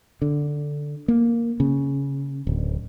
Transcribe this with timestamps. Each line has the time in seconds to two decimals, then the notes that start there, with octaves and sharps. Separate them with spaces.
0.22 D3
1.08 A#3
1.60 C#3
2.47 D1